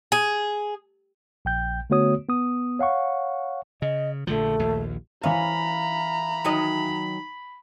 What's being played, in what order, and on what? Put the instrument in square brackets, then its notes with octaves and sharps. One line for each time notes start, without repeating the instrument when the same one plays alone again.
[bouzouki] G#4
[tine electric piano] A#1 G5 G6
D3 A3 B3 F#4 C#5 D#6
B3 D#6
C#5 F5 F#5 C#6
[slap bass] C#3 [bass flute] D#5
[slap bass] A#1 D3 F3 [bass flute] A3
[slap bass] A#1 D#2
[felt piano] E3 F5 [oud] C#4 [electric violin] A#5 [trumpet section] B5
[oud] D#3 F#3 D#5